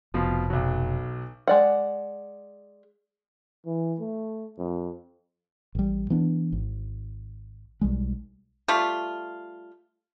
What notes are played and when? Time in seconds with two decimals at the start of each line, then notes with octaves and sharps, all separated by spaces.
0.14 F1 B2 F3
0.50 B1 F#3
1.48 G#3 D5 F#5
3.66 E3
4.00 A3
4.58 F2
5.75 A1 G3
6.10 E3 B3 D4
6.52 G#1
7.81 B1 G3 G#3
8.68 G3 A3 F4